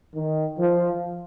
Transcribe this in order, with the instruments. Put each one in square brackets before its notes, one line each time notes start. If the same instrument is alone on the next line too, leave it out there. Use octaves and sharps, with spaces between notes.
[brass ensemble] D#3
F3